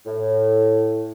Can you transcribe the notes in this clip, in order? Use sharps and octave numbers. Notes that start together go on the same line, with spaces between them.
A2